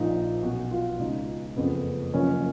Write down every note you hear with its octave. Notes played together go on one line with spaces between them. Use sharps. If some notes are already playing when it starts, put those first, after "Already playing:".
Already playing: A#1 A#2 F3 D#4
B1 B2 F#4
F4
C#2 B2 D#4
F#1 F2 C#3 B3
F#1 F#2 F3 C#4